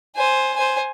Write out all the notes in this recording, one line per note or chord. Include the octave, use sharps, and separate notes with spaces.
C5 G#5
C5 G#5